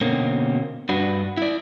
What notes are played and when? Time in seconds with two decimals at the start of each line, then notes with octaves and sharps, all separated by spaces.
0.01 B2 D3 A#3 C4 C#4
0.89 G2 D4 F#4 B4
1.37 E4 D5